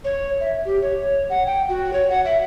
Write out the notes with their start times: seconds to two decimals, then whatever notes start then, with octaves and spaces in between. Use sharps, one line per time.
0.04 C#5
0.41 E5
0.65 G4
0.82 C#5
1.30 F#5
1.46 G5
1.69 F#4
1.93 C#5
2.10 F#5
2.25 E5